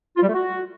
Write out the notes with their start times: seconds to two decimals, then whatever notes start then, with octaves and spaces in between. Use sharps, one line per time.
0.17 F4
0.23 G3
0.28 A3
0.34 F#4